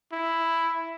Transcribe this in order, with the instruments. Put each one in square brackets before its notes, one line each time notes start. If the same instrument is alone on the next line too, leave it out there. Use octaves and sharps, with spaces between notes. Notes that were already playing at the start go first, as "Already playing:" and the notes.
[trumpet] E4